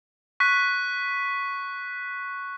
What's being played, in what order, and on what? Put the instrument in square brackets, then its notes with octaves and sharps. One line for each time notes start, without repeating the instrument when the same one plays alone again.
[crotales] C#6 F#6 B6